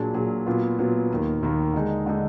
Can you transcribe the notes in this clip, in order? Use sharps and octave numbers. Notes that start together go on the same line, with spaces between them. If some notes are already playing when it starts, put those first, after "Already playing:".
Already playing: A#2 F#3 D4 G#4
A#2 F#3 D4 G#4
A#2 F#3 B3 F4
A#2 F#3 B3 F4
D#2 D#3 A#3
D#2 D#3 A#3
D3 G#3 D#4 G#4
D3 G#3 D#4 G#4